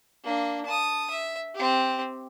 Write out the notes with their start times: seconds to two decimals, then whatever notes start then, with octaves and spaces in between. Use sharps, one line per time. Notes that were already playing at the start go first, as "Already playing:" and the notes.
0.24 A#3 D4
0.66 A5 D#6
1.10 E5
1.55 C4 G4